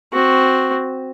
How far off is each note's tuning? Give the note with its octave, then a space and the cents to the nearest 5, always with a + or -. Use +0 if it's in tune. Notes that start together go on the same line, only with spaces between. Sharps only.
C4 +0 F#4 +0